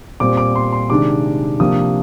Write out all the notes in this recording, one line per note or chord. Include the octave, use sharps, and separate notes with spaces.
A#2 G3 C4 D6
D6
C6
C6
C3 D#3 G#3 D4 D6
C3 F3 A#3 D4 D#6